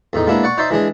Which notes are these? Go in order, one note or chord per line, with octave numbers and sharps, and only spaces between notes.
E2 A2 D#4
G#3 A#3 B3 D4 E4
D5 F#5 C#6
D#4 C5 D5 E5 C6
E3 G#3 D4 G#4